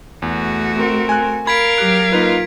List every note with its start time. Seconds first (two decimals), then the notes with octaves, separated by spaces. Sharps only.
0.22 E2 A3 F#4
0.75 C4 A#4
1.09 G#5 F#6
1.47 A#4 F5 B5 G#6 B6 D7
1.78 F#3 G4 F#6
2.12 A#3 D#4 F4 B4